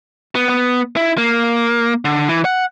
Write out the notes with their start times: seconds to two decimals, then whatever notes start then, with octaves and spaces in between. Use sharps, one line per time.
0.35 B3
0.49 B3
0.97 E4
1.18 A#3
2.05 D3
2.28 E3
2.45 F#5